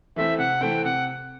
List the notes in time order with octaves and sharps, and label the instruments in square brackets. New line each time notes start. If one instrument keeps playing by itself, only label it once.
[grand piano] E3 A3 C4 [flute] E5
[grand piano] C3 [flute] F#5
[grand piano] E3 A3 C4 [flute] G5
[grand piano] C3 [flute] F#5